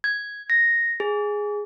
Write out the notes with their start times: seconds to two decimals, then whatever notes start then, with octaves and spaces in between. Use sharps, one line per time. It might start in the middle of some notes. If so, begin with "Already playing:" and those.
0.04 G#6
0.50 A#6
1.00 G#4